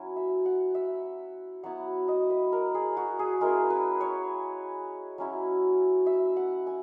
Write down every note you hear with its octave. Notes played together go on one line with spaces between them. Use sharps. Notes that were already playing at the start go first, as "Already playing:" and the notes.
Already playing: F#3 C#4 E4
E5
F#5
E5
F#3 B3 E4 F#5
D#5
B4
A#4
G#4
F#4
G#4
G#3 C#4 E4 A#4
B4
C#5
F#3 C#4 E4
E5
F#5
G#5